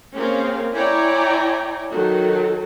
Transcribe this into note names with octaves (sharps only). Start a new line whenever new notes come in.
A#3 C4 C#4 G#4 A#4 F5
E4 C#5 D5 G5 G#5 A#5
D#3 F#3 F#4 A4